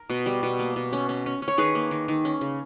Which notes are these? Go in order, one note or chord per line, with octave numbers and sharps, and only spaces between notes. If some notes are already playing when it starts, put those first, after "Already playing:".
Already playing: A#4
B2
G3
B2
A#3
B2
C#4
C#4
C#4
C#4
C#5
D#3 G#4 B4
A#3
D#3
D#3
C#4
C#3